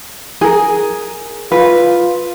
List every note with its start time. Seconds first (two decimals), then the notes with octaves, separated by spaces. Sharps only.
0.41 G#4 A#4
1.52 F4 B4